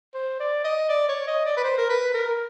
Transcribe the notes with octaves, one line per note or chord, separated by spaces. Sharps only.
C5
D5
D#5
D5
C#5
D#5
D5
B4
C5
A#4
B4
A#4